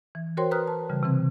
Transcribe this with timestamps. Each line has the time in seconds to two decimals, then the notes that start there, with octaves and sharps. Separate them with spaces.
0.15 E3
0.37 F#4 A#4 C5 C#5 G5 C6
0.51 B4 A#5 D#6 F6 F#6
0.68 A5
0.90 C#3 E3 G3
1.03 C3 E3 C4